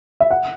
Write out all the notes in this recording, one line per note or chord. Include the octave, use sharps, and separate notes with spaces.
E5
F#5